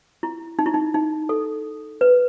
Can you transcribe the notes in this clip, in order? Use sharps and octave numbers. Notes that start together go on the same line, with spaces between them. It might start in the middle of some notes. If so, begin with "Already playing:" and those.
E4
D#4
E4
D#4
D#4
A4
B4